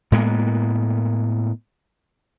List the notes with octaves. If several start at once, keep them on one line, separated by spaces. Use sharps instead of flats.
A2 G#3 A#3 B3